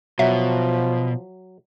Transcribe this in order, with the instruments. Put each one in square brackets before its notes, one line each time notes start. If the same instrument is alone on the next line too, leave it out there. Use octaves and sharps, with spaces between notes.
[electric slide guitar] B2 [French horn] F3 [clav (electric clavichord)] F#3 [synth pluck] E5